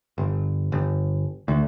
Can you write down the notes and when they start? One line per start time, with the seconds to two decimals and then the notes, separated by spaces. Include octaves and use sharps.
0.18 G1
0.72 G1
1.48 D2